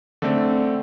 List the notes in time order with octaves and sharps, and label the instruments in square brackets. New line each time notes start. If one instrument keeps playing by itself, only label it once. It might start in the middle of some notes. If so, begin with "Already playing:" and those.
[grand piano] D3 A3 C4